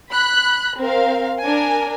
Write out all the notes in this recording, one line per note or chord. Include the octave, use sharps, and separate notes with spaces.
B5 F#6
C4 A#4 F5
D4 A#4 G#5